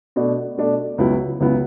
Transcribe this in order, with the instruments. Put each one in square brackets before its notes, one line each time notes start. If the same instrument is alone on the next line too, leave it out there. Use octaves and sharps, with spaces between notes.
[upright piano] B2 A3 D4
B2 A3 D4
C#2 C#3 F#3 B3 E4
C#2 C#3 F#3 B3 E4